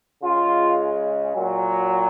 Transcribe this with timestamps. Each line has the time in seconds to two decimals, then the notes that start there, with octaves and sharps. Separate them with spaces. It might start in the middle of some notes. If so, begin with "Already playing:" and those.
0.23 C#3 G#3 F4
1.35 A#2 F#3